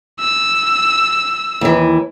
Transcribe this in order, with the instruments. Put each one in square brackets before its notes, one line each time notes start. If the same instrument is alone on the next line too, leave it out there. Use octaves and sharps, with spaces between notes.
[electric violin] E6
[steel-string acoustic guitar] D#2 E3